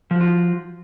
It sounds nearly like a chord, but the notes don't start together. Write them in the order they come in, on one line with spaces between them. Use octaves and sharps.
F3 F#4 F4